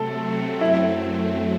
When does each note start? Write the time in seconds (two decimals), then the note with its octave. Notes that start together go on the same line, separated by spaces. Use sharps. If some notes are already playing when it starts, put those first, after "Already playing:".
Already playing: C3 F#3 A3 C4 A4
0.61 F#2 F#3 A3 C4 E4